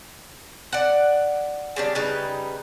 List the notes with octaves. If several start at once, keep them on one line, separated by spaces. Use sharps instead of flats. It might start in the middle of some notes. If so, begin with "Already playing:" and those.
D5 F#5
C#3 G3 D4
C#3 G3 D#4 B4